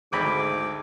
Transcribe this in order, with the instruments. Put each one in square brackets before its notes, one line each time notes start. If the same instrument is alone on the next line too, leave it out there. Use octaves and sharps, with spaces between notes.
[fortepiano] G#1 D2 B5 [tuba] G#2 [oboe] D6